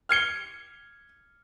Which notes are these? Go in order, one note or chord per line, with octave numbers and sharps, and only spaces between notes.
F6 G#6 C#7 G7